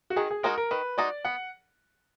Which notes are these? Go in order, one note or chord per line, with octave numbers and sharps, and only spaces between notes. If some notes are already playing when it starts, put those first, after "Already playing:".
F#4
D#3 G#4
G#4
G#3 D#4 F#4 A#4
A#4
D#3 B4
G#3 D#4 F#4 D5
B3 F#5